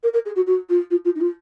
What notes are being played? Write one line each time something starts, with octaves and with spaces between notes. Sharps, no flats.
A#4
A#4
G#4
F#4
F#4
F4
F4
F4
D#4
F4